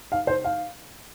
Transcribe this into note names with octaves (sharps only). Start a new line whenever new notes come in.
F5
C5
F5